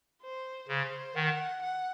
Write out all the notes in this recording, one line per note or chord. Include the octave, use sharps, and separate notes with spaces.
C5
C#3 C5
D#3 F#5
F#5